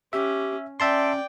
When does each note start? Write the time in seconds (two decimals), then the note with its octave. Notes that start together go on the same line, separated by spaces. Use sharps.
0.13 C#4 G4 E5
0.80 C#4 D5 E5 G5 A5 C6